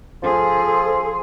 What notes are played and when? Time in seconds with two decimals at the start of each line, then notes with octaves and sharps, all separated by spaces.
0.23 F3 G#4 A4 C6